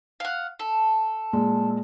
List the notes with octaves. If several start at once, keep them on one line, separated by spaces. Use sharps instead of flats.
F5 F#5
A4
A#2 G#3